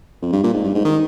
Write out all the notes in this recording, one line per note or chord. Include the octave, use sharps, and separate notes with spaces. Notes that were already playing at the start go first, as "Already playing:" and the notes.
F2
G2
A#2
G#2
G2
G#2
D#3